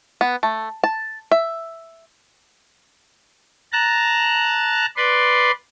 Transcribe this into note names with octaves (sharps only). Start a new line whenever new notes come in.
B3
A3
A5
E5
A5 A#5 F#6
B4 D5 C6